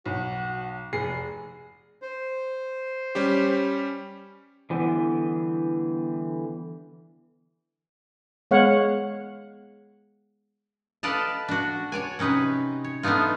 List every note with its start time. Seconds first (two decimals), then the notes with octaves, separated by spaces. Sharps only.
0.06 B1 F#4
0.93 F1 G#4 C7
2.02 C5
3.15 G3 C#4 G4
4.70 D3 E3 G3 B3
8.51 G#3 B3 C#5 F5 F#5
11.03 A4 B4 D5 D#5 F5 A5
11.48 D4 F#4
11.92 C#5 D5 G#5
12.19 C3 C#4 D#4 B4
12.84 C#5
13.03 A3 B3 D4 D#4 F4